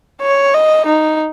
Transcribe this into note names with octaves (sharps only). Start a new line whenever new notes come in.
C#5
D#5
D#4